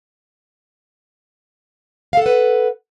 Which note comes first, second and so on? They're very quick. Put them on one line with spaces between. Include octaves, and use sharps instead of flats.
F5 A4 F#5 B4